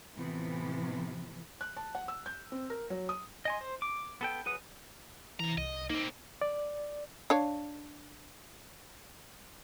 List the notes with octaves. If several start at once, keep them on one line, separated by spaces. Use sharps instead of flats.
A2 C3 E3 F3 B3
F#6
A5
F#5
E6
G6
C4
A#4
F#3
D#6
D#5 G#5 C6
C5
D6
B3 A4 G5
F#3 G#4 B4 F#5 D#6
C3 E3 A#5
C2 D#5
A#3 C4 D#4
D5
D4 C#5 F5